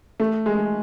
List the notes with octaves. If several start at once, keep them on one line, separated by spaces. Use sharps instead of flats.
A3
G#3